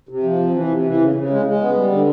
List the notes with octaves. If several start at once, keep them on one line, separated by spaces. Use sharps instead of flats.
C3
F3
C3
E3
C3
E3
C#3
C#3
G#3
G#3
B3
G3
D3